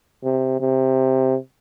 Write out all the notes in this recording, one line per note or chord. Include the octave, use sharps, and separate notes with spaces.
C3
C3